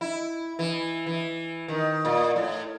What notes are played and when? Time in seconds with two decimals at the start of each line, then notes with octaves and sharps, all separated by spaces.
0.01 E4
0.59 E3
1.06 E3
1.68 D#3
2.05 A#2
2.36 A2